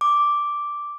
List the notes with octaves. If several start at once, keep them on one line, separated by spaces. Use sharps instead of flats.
D6